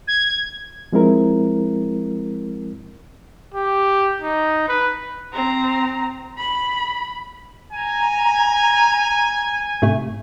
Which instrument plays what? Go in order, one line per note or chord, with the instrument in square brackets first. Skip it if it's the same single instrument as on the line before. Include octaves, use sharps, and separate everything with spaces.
[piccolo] G#6
[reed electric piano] F3 G#3 C4 E4 A#4
[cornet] G4
D#4
B4
[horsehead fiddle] C4 A#5
B5
[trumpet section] G#5 [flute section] A#5
[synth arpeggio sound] G#2 C3 A3